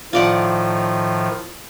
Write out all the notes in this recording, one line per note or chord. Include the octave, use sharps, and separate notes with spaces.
A2 D#3 F3 F4 D5 F#5